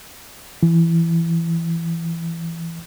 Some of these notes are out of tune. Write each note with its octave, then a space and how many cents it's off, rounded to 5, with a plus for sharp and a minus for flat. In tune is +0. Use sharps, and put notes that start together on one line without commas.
E3 +15